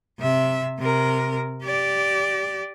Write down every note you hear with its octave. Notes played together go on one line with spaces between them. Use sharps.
C3 E5
C3 A#4
G4 D5